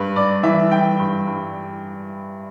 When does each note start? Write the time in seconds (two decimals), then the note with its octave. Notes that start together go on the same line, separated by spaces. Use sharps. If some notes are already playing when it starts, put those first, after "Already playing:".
Already playing: G2 B4
0.16 G2 D5
0.43 E3 E5
0.71 E3 G5
0.99 G2
1.27 G2